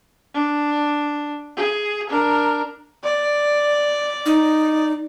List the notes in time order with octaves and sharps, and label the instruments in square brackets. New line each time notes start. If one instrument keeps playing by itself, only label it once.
[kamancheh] D4
G#4
D4 A#4
[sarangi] D5
[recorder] D#4